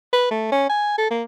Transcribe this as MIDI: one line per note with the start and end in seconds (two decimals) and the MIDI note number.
0.13 0.27 71
0.31 0.49 57
0.52 0.69 61
0.70 0.96 80
0.98 1.11 69
1.11 1.23 58